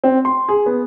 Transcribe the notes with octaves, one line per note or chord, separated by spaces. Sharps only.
C4
C6
G#4
B3